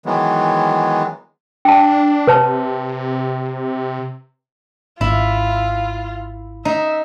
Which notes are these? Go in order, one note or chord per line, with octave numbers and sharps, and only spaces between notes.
D#3 E3 F#3 G#3 B3
D4 G5 A5
C3 B4 C#5 A5
G#1 E4 F4
D#4 E5